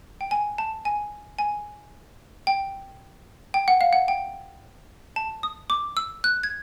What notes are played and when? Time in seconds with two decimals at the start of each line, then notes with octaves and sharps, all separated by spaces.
0.21 G5
0.31 G#5
0.58 A5
0.85 G#5
1.39 G#5
2.47 G5
3.54 G5
3.68 F#5
3.81 F5
3.93 F#5
4.08 G5
5.16 A5
5.43 D#6
5.70 D6
5.97 E6
6.24 F#6
6.43 G#6